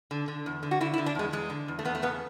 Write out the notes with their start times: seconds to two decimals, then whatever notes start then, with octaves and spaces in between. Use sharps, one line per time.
0.11 D3
0.28 D3
0.46 E2
0.63 D3
0.71 F#4
0.81 D3 E4
0.94 E4
0.98 D3
1.06 D4
1.15 E2 G#3
1.32 E2 G#3
1.50 D3
1.68 E2
1.79 A3
1.85 E2 B3
1.95 A3
2.02 C#3 B3